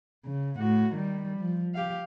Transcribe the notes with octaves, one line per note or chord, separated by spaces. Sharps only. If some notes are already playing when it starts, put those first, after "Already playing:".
C#3
A2 F#4
D#3 G3
F3
G4 F5